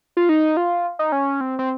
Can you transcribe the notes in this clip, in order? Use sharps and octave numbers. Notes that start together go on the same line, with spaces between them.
F4
D#4
F4
D#4
C#4
C4
C4